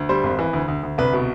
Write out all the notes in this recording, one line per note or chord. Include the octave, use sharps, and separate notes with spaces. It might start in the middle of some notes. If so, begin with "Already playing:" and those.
Already playing: D2
G3 C5
G#1
E3
D2
D2
D2
C2 B4
B2